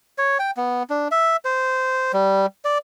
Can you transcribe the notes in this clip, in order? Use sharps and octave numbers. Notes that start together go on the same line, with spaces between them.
C#5
G5
B3
D4
E5
C5
G3
D5